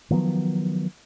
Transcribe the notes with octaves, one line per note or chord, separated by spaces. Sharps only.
D#3 F3 F#3 B3